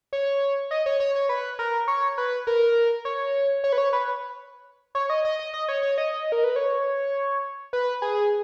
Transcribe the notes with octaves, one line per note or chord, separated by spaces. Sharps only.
C#5
D#5
C#5
C#5
C#5
B4
A#4
C#5
B4
A#4
C#5
C#5
B4
C#5
B4
C#5
D#5
D#5
D#5
D#5
C#5
C#5
D#5
A#4
B4
C#5
B4
G#4